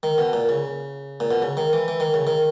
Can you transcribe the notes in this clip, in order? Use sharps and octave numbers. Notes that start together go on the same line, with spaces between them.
D#3
B2
A#2
C#3
A#2
B2
C#3
D#3
E3
E3
D#3
C#3
D#3